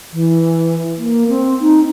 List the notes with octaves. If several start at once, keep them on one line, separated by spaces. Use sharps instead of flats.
E3
A#3
C4
D#4